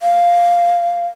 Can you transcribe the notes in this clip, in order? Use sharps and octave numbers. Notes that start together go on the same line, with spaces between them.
F5